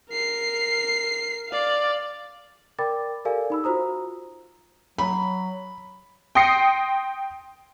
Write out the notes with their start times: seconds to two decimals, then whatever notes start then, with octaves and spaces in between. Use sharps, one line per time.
0.10 A#4 C7
1.49 D5 F5
2.79 A#4 D5 G5 B5 D6 A6
3.25 G4 A4 A#4 D5 F5 G#5
3.50 D#4 B5 E6
3.64 F4 F#4 C5 A#5 D#6
4.98 F#3 B5
6.35 G5 C6 D#6 A#6 C7 C#7